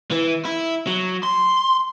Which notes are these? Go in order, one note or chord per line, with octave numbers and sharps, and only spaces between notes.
E3
E4
F#3
C6